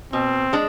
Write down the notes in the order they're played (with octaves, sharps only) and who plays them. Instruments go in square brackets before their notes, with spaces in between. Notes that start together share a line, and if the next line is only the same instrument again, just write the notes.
[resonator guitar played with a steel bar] B2 [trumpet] C4
[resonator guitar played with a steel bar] G#3 D4